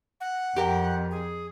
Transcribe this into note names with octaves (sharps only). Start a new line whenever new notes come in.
F#5
F2 G4 A#4 G5
G#4